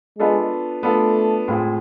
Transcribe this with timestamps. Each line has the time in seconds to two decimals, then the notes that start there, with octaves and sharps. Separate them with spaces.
0.19 G#3 B3 D4 F4 A4
0.83 A3 B3 D4 F4 A4
1.48 A2 G#3 C4 F4 G#4